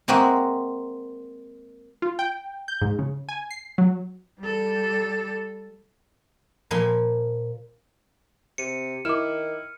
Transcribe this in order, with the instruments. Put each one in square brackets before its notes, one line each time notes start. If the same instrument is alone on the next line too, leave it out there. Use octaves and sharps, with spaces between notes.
[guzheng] G#3 A#3 C4 F#4 D#5 E5
[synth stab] F4
G5
G6
G#2
C#3
G#5
C7
F#3
[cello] G3 A4
[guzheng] A#2 F3 A#4 G#5 B5 C6
[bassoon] C3 [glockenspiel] C#7 D#7
[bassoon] D#3 [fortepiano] E4 [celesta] D6 E7 [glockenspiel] F6